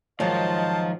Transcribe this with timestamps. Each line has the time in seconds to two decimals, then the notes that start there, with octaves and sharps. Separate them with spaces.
0.20 G#2 D#3 F3 F#3 D#5 F5 A5